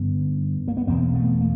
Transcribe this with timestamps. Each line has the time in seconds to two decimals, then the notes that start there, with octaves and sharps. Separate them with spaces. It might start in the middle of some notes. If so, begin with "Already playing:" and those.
Already playing: G2 D3 B3 C#4
0.68 A#3
0.77 B3
0.87 E2 B2 A#3 C4
1.14 A3 B3
1.41 A#3